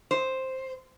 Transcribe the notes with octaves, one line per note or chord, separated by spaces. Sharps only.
C5